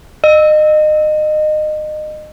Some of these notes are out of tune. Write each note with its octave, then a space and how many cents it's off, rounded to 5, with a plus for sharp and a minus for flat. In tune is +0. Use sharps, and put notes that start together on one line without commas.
D#5 -25